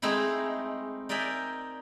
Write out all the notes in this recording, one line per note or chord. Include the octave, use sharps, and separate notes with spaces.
G#3 A3 C4 D#4 E4
D#4 A#4 D5 E5 G5 G#5